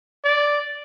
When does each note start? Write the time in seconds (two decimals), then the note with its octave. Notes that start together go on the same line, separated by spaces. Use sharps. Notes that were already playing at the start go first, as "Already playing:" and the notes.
0.24 D5